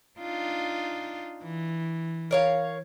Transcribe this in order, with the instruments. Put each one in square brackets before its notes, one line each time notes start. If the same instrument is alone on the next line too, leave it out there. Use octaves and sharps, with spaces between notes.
[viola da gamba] D4 D#4 F4
E3
[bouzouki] A#4 C#5 F5